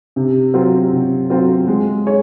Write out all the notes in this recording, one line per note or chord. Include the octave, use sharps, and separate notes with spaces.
C3
F#3 C4 F4
C3
F#3 C4 F4
G#3
G#4 C#5